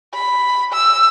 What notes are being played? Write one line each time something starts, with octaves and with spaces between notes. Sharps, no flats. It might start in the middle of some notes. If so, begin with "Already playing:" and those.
B5
E6